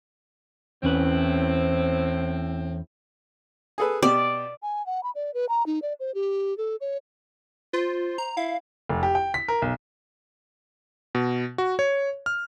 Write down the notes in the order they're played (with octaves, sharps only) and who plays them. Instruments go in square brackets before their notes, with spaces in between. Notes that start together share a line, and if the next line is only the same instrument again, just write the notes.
[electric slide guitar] E2 C#4 B4 [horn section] A2 C4
[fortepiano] G#4 A4 B4
[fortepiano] B2 G4 [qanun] D5
[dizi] G#5
F#5
B5
D5
B4
A#5
D#4
D5
C5
G4
A4
C#5
[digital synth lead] F4 [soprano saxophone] C5
[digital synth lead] A#5
[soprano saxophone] E4 [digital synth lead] F5
[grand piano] F1
G4
G5
B6
A#4
B1
[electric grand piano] B2
F#4
C#5
F6